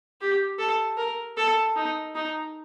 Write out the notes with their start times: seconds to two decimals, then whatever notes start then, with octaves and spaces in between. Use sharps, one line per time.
0.21 G4
0.59 A4
0.98 A#4
1.38 A4
1.76 D#4
2.15 D#4